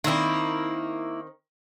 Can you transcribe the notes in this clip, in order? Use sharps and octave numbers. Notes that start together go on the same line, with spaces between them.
D#3 A#3 C4 E4